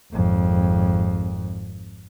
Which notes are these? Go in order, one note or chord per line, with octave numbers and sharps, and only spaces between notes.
G#1 F2